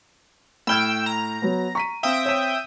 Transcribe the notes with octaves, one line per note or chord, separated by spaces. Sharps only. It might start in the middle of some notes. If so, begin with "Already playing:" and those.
A2 G5 B5 E6 F6 G6 G#6
A#5
F#3 B3
A#5 C#6 B6 D#7
C4 E5 F5 G5 D#6
C#5 E7